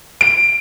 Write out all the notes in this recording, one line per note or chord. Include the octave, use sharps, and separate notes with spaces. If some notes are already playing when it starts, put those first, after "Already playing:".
D7